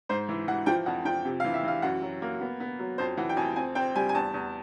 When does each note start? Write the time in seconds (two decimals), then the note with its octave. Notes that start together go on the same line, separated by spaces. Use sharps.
0.09 G#2 C5
0.29 E3
0.48 E3 F#5
0.66 F3 G5
0.86 F2 F#5
1.05 F3 G5
1.25 C3
1.40 F5
1.44 E3
1.54 E5
1.63 E3 F5
1.82 F#2 F#5
2.02 F#3
2.22 A#3
2.41 B3
2.60 B3
2.79 F#3
2.98 F2 C5
3.17 E3 F#5
3.29 G5
3.37 F2 G#5
3.56 C4 G#5
3.75 C4 G5
3.95 G3 G#5
4.09 G#5
4.14 E2 A5
4.34 E2